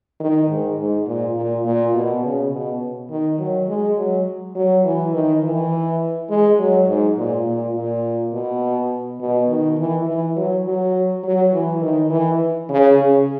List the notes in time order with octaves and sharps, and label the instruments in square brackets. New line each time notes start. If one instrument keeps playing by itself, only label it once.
[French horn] D#3
G#2
G#2
A#2
A#2
A#2
B2
C#3
B2
D#3
F#3
G#3
F#3
F#3
E3
D#3
E3
G#3
F#3
G#2
A#2
A#2
A#2
B2
B2
D#3
E3
E3
F#3
F#3
F#3
E3
D#3
E3
C#3
C#3